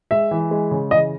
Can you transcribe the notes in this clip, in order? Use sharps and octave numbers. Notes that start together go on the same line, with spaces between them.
G#3 E5
E3
G#3
C#3
E3 D#5